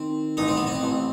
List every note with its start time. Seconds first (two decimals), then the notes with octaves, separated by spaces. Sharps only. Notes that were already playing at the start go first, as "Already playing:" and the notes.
Already playing: D#3 C4
0.37 A1 D#4
0.48 C4
0.57 B3
0.67 C4
0.83 A1